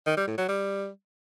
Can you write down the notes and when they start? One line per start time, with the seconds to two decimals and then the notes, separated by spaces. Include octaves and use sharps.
0.06 D#3
0.17 G3
0.27 A2
0.38 F#3
0.48 G3